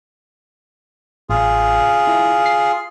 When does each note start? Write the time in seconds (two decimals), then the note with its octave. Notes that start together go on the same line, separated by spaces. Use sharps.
1.30 A1 F4 G#4
2.07 E4
2.46 C7